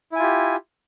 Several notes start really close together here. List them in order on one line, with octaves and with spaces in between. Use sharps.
E4 G#5 F4 G4